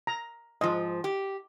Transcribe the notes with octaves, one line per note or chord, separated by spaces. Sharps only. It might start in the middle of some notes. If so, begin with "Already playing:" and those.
A#5
G#2 F3 D#5
G4